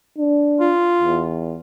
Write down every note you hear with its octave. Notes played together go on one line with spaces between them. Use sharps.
D4
F4
E2